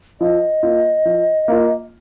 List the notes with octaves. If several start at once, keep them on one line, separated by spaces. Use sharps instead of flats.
F3 D#5
A#3 F4
F3
A#3 F4